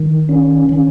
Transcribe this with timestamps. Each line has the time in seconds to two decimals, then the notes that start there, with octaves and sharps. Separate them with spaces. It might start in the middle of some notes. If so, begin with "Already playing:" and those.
Already playing: D#3
0.29 C#4
0.69 D#3